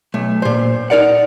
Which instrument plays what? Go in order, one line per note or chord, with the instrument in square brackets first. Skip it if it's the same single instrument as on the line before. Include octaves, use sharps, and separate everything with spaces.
[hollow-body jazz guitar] B1 A3
A#2 C5
D#4 A#4 D5 F#5